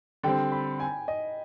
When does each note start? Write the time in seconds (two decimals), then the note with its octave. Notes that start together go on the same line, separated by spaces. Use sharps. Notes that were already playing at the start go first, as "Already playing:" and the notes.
0.24 D3 G3 C4 G5
0.52 B5
0.80 G#5
1.08 D#5